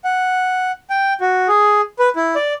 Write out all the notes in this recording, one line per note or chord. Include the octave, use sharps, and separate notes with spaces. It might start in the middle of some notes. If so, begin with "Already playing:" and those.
F#5
G5
F#4
G#4
B4
E4
D5